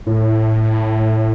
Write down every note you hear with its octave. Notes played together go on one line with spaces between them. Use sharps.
A2